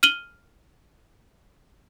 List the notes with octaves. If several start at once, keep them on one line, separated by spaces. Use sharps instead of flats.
F6 D#7 F#7 G7